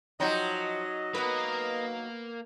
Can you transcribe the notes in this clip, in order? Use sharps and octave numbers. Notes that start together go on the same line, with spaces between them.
F3 F#3 D#4 G4 D#5
A#3 B3 A#4 B4